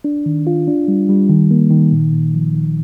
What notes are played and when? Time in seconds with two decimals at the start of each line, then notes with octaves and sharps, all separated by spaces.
0.04 D4
0.26 D#3
0.47 F4
0.68 D4
0.88 G3
1.09 G3
1.29 D#3
1.51 A#3
1.71 D#3
1.92 A#2
2.13 A#2
2.34 F3
2.55 D#3